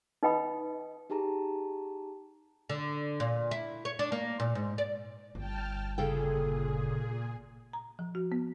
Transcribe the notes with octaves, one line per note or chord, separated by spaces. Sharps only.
D#4 B4 D#5 G5 B5 D#6
D#4 G4 G#4 A5 A#5
D3
A#2
E4
C#5
D4
A#3
A#2
G#2
D5
G1 G5 A5 F6
A#2 C#3 G#4 A4 G5
A#5
F3
F#4
B3